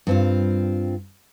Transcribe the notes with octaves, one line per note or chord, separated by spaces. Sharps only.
G2 C4 F4